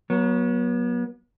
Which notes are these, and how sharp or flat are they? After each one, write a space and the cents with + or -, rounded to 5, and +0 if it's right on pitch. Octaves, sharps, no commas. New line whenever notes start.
F#3 +0 B3 -40 C#5 +0